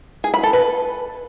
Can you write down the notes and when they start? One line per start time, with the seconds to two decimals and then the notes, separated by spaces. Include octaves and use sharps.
0.24 G#4
0.34 B5
0.43 A4
0.53 B4